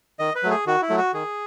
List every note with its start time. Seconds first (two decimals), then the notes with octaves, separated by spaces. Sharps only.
0.19 D#3 D#5
0.35 B4
0.43 F#3 A3
0.51 G#4
0.66 D#3 F#4
0.82 E4
0.89 F#3 A3
0.98 F#4
1.13 D#3 G#4